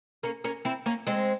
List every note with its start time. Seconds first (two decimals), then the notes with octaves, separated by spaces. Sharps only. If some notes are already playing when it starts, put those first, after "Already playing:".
0.23 A#3 C#4
0.44 A#3 C#4
0.65 C4 E4
0.86 A#3 C#4
1.07 G#3 C4